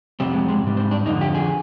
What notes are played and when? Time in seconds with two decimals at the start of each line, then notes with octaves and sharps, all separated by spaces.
0.20 F2 C3 G3 C4
0.34 G#3
0.48 G#3
0.64 G#2 G3
0.77 C4
0.91 D4
1.06 F2 D3 F3 D#4
1.21 G4
1.35 G#4